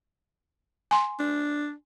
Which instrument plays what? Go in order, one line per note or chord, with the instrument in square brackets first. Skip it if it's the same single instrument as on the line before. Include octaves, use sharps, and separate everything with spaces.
[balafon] G#5 C6
[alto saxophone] D4